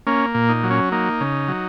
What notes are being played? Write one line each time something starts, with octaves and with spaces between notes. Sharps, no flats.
A#3 C#4
A#2
D#4
F#3
C#4
A#3 D#4
C#3
F#3